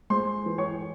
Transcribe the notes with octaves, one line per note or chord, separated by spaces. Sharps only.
G#3 C5 C6
E3
C#5 C#6